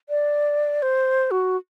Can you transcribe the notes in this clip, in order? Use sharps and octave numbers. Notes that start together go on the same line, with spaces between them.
D5
C5
F#4